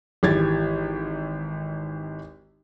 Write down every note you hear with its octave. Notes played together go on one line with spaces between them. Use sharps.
G#1 E3 G4 G#6 A6